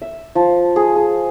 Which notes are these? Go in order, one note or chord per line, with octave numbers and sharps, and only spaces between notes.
E5
F3
G#4
G#4